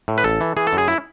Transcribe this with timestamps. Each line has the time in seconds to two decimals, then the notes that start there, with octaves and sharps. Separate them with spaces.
0.08 A2
0.18 B4
0.24 A1 A4
0.41 E3
0.57 E3 G#4
0.67 A4
0.73 F#2
0.78 G#4
0.88 E4